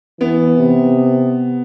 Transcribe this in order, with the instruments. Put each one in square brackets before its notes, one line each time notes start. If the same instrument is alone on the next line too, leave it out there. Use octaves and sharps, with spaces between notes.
[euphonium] E3 [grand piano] B3
[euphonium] C3